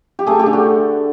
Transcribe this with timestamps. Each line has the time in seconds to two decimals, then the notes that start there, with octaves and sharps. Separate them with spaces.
0.19 G4
0.27 A3 G#4
0.39 G4
0.46 D3
0.53 F#4